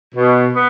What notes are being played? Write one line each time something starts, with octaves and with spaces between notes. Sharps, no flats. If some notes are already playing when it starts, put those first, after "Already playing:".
B2
B3